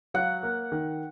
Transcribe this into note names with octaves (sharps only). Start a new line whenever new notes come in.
F#3 F#5
A#3
D#3